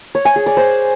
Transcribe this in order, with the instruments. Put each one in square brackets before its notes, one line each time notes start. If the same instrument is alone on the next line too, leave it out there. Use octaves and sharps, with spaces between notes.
[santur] C#5
G#5
G#4
D5
C5